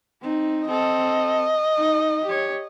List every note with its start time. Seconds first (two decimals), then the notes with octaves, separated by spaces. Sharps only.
0.22 C4 D#4
0.67 C4 A4 D#5
1.77 D#4
2.25 G4 C#5